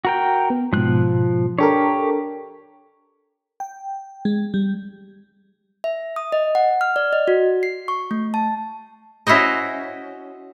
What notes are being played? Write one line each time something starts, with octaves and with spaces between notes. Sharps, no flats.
F#4 A#4 G5
B3
G#2 B2 F3 F#6
D4 G4 A4 A#4 C#5
G5
G#3
G3
E5
D#6
D#5
F#5
F6
D5
D#5
F#4
C7
C#6
A3
A5
C#4 E4 F#4 C5 D#5